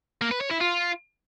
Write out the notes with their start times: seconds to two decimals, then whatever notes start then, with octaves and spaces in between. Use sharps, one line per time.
0.21 A#3
0.31 B4
0.41 C#5
0.51 E4
0.61 F4